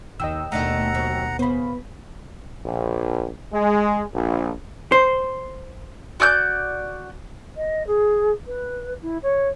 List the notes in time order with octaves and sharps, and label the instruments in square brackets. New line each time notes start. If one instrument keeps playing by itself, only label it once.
[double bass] D#2 [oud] D#3 [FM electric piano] D#5 G5 E6
[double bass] D#2 B2 [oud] A3 D4 D#4 [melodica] F#5 A#5
[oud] F#3 C4 F#4
[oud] C#3 C5 [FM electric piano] B3 B5
[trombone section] A#1
G#3
A#1
[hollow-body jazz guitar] C5
[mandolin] F#4 D5 F6 G6
[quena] D#5
G#4
B4
E4
C#5